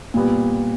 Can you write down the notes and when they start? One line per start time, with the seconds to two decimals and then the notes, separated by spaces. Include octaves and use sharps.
0.14 A#2 G3 B3